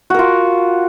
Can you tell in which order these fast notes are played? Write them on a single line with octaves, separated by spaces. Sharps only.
F#4 A#4 F4